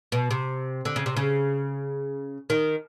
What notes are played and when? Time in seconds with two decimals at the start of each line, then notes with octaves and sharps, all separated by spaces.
0.12 B2
0.31 C3
0.85 D3
0.96 C#3
1.06 C3
1.17 C#3
2.50 D#3